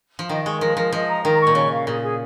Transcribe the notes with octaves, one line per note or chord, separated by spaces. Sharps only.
F3
D#3 D#5
G#3 C#6
F3 A#4
F3 A#4
F3 D#5
A#5
D#3 A#4
C#6
A#2
C#3 C#5
F5
A#2 G#4
G#4